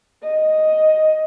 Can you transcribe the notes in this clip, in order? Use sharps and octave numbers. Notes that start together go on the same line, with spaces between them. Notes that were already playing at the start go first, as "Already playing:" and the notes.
D#5